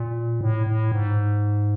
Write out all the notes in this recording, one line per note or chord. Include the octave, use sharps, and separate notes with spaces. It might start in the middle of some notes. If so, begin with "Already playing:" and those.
Already playing: A#2
A2
A2
G#2